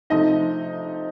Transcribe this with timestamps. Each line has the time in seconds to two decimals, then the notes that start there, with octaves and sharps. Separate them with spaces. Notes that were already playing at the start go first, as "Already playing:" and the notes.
0.10 C3 F3 A3 D#4 D#5